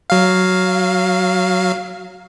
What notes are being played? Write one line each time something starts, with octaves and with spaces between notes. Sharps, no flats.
F#3 F5